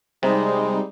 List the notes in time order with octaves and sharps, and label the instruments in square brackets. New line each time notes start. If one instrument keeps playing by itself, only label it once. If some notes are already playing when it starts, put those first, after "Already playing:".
[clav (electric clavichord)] C3 [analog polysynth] G3 C4 D#4 [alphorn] G#3